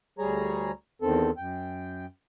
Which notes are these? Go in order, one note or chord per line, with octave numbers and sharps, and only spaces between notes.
D2 G3 G#4 C#5 A#5
E2 D#3 C4 A4
F#2 G5